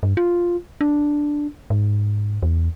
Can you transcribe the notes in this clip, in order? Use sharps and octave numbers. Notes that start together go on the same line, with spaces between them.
G2
F4
D4
G#2
E2